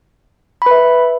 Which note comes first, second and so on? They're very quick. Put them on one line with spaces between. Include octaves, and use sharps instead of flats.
B5 B4 E5